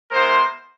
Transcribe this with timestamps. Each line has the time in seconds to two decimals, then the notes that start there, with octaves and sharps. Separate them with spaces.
0.11 G#3 B3 E4 A#4 C5